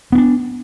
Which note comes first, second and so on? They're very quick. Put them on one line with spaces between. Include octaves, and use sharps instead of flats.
B3 C#4 D4